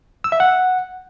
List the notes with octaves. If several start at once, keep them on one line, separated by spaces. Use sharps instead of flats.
E6
E5
F#5